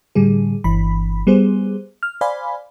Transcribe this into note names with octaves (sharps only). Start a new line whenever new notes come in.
A2 D3 G3 G#4
G1 E3 B5
G3 B3 G#4 C5
F6
C5 D5 F5 G#5 B5